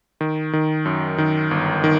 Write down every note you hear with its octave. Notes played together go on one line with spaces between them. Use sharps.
D#3
D#3
F#2
D#3
G1
D#3